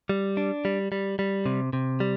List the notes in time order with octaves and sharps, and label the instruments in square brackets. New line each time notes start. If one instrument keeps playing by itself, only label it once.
[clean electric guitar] G3
D4
G3
G3
G3
C3
C3
G3